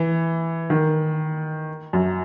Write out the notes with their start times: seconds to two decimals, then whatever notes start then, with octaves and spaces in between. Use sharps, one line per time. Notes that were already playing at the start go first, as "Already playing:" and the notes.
Already playing: E3
0.70 D#3
1.93 F#2